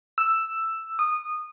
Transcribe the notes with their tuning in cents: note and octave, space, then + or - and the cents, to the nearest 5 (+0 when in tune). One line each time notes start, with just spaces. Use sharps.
E6 +5
D#6 -20